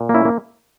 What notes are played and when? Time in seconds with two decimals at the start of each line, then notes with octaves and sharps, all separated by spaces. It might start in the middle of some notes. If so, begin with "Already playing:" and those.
Already playing: A#2
0.09 A#3
0.14 C#4 E4
0.25 A#3